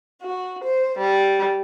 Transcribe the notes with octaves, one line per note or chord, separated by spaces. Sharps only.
F#4
C5
G3